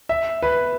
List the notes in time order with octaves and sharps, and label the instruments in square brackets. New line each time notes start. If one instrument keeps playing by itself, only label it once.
[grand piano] E5
B4